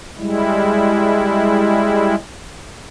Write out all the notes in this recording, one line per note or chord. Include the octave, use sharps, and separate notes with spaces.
G3 G#3 E4